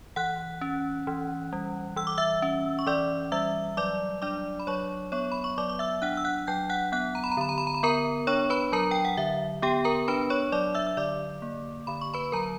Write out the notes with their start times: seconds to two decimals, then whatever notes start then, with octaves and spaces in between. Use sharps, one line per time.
0.16 E3 F#5 F#6
0.61 C#4
1.07 E3
1.53 G3
1.96 E3 E6
2.07 D6
2.18 E5 E6
2.42 C#4
2.79 C#6
2.86 E3 D5 D6
3.32 G3 E5 E6
3.77 F#3 D5 D6
4.22 D4 D5 D6
4.60 B5
4.67 F#3 C#5 C#6
5.12 B3 C#5 C#6
5.32 B5
5.44 C#6
5.58 F#3 D5 D6
5.69 D6
5.79 E5 E6
6.02 D4 F#5 F#6
6.17 E6
6.25 F#5 F#6
6.47 F#3 G5 G6
6.70 F#5 F#6
6.92 B3 F#5 F#6
7.15 A#5
7.24 B5
7.31 A#5
7.37 D3 B5
7.49 A#5
7.58 B5
7.67 A#5
7.74 B5
7.83 B3 A#4 A#5
8.27 D4 C#5 C#6
8.50 B4 B5
8.72 F#3 A#4 A#5
8.91 G5
9.05 F#5
9.17 D3 E5
9.62 B3 G4 G5
9.84 A#4 A#5
10.08 D4 B4 B5
10.30 C#5 C#6
10.52 F#3 D5 D6
10.75 E5 E6
10.87 E6
10.97 D3 D5 D6
11.42 A#3
11.87 D3 B5
12.01 C#6
12.14 B4 B5
12.32 F#3 A#4 A#5